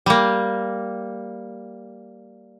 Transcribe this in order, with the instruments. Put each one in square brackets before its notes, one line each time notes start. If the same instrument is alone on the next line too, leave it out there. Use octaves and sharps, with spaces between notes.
[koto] G3 A#3